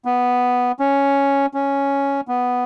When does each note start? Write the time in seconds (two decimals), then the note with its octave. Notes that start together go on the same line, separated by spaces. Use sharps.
0.05 B3
0.79 C#4
1.54 C#4
2.28 B3